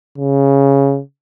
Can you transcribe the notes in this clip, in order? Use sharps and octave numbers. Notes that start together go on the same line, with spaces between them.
C#3